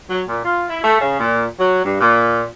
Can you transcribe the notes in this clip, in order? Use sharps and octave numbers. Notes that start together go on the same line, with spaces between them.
F#3
A#2
F4
E4
A3
C#3
A#2
F#3
G2
A#2